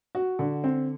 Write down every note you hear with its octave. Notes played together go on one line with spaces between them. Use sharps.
F#4
D3
C4